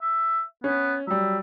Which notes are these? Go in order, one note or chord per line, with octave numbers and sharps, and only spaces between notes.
E5
B3 C#4
F#3 G3 E5